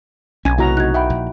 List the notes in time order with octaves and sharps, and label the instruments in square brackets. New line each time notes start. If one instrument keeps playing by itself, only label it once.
[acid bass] B1 [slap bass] C#4 [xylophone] G#5 G#6
[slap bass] C3 A3 [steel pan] E4 F#4 A#5
[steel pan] D#4 F#4 [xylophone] F#6 G#6
[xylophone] E5 F#5 B5 [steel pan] G5
[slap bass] A#1